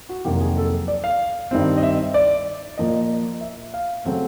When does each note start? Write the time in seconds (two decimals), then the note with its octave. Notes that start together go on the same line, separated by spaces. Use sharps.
0.09 F#4
0.25 F2 C3 D#3 F#3 A#3 G4
0.41 G#4
0.57 A4
0.88 D5
1.04 F5
1.51 G2 D#3 G3 C4
1.77 D#5
1.83 E5
2.14 D5
2.78 A#2 F3 A#3 D#5
3.41 E5
3.74 F5
4.05 C#3 F#3 A3 C4